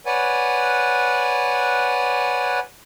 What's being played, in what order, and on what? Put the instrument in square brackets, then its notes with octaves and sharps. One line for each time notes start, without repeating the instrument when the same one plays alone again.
[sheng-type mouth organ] B4 C#5 D5 F#5 G#5